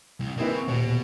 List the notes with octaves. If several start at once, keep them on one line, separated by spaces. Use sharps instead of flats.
C2
A#3 C4 E4 G#4 B4
C#6
D#1 B2